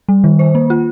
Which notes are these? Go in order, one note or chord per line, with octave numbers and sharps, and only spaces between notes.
G3
D#3
C5
A#3
F4